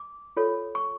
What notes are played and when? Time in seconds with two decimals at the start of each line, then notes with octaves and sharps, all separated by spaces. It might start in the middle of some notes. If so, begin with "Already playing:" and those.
Already playing: D6
0.37 F4 A4 C#5
0.75 C#6